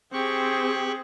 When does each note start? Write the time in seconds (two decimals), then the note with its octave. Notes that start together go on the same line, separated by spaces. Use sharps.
0.13 C4 G4 G#4 C#6 F#6